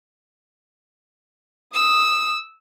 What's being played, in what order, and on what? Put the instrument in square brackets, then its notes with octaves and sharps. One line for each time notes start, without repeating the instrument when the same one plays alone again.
[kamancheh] D#6 [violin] E6